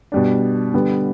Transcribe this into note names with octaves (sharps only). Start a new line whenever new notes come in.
B2 G3 D4
D3 G3 B3